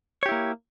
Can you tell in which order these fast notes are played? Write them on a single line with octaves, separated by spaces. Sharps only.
C#5 G4 E4 A#3